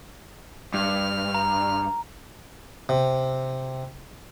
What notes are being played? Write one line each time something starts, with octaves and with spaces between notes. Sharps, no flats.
G2 F6
A#5
C3